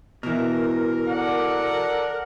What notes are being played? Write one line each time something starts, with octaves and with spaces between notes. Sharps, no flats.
B2 E3 A#4
A4 D5 F#5